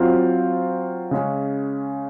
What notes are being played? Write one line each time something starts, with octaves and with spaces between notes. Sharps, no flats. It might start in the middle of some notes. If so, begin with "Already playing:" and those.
Already playing: F#3 C4 F4 C5 F5
C#3 G#3 C#4